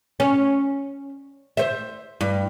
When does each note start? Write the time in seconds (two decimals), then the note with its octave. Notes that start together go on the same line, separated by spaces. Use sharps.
0.20 C#4
1.57 C5 E5
2.21 G2